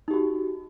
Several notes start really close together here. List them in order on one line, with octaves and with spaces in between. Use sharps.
D#4 G4 F#4